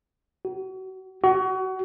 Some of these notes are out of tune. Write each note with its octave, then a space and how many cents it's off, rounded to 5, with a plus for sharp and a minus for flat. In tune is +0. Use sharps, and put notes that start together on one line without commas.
F#4 +30
F#4 +25